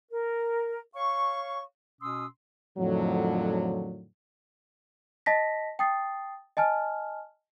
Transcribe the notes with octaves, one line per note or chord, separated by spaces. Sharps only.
A#4
C#5 F5 C#6
B2 C#4 C6 D#6 E6
F2 A2 D3 D#3 F3 F#3
D#5 A5 A#6 B6
G5 A5 D#6 A6 C7
D#5 G#5 A5 F6